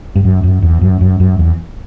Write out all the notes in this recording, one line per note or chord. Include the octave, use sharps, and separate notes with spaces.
G2
F#2
F#2
E2
F#2
F#2
F#2
E2